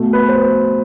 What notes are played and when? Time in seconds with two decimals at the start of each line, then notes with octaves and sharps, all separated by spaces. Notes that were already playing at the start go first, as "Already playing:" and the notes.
Already playing: B2 A3
0.13 B4
0.29 C5
0.36 B4